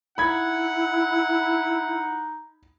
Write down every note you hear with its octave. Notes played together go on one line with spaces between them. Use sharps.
D#4 E4 F#5 B5 G#6